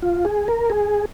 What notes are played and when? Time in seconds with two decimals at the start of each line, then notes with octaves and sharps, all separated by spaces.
0.02 F4
0.25 G#4
0.48 A#4
0.70 G#4